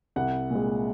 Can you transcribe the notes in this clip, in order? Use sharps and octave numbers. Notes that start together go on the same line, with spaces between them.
C2 F#5
A#2 G#3